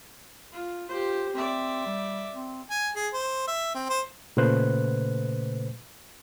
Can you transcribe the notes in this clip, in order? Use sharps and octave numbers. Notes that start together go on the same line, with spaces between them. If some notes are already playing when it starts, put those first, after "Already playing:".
F4
F4 G4 C5
C4 D5 E5
G3
C4
G#5
G#4
C5
E5
C4
C5
A#2 C#3 A3 B4 C5 F#6